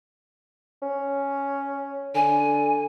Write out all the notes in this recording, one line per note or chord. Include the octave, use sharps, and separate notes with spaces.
C#4
D3 G#5